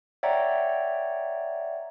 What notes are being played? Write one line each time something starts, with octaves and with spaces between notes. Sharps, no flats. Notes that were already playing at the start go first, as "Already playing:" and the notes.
C#5 D5 E5 F#5 G5 A#5